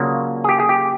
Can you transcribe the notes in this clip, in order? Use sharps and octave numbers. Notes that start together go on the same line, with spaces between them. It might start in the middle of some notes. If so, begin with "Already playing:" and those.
Already playing: C#3 F#3 A#3 D4 F4 F#4
G#4
G4
G#4
G4